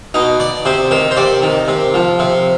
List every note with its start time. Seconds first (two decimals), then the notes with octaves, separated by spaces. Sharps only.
0.14 B2 D#4
0.40 D5
0.65 C3 C5
0.91 D#3 C5
1.11 C5
1.17 C3 D5
1.42 D#3
1.68 C3
1.94 F3
2.19 C3